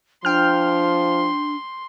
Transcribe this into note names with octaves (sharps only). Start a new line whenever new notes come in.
F3 D4 G5 C6 F6